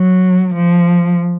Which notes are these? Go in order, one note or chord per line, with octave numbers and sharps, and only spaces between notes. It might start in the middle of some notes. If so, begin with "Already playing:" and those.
Already playing: F#3
F3